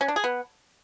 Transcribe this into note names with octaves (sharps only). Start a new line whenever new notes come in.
C#4
D4
G#4
B3